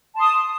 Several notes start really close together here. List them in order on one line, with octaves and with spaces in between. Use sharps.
A5 C6 D#6